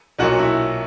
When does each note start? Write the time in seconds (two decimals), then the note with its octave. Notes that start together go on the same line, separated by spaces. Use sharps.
0.19 B1 A#2 F#3 F#4
0.39 E4